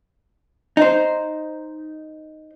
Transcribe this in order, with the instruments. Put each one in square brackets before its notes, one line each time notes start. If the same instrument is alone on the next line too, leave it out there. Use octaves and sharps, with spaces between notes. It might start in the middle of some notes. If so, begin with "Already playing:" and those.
[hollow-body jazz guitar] D#4 C5